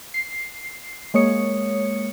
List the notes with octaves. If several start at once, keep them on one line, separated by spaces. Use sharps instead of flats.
C7
G#3 A#3 C#5 D#6 C#7